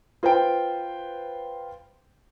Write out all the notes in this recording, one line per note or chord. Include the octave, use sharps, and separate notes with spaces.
F4 B4 C5 G5